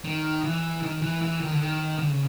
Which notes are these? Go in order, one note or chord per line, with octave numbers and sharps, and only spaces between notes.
D#3
E3
D#3
E3
E3
D#3
D3
D#3
D3
C#3